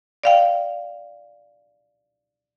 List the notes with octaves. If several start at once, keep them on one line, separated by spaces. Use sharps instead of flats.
D5 F5 G5